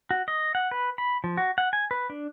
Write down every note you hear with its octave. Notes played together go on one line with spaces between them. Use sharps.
F#4
D#5
F#5
B4
B5
F3
F#4
F#5
G#5
B4
D4